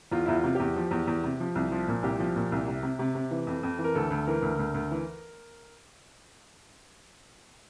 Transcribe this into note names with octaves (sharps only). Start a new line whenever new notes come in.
E2 F4
E4
E2 F4
C3
E2 G4
F3
E2
E2
C3
F3
C2
F3
A#2
C2 G4
F3
A#2
C2
C3
C3
C3
C3
E3
F2
F2
E3
A#4
D2 A4
D2
E3 A#4
D2
D2
D2
E3